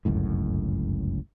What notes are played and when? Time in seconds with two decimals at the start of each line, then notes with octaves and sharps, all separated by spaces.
0.05 G1 C#2 F#2 A2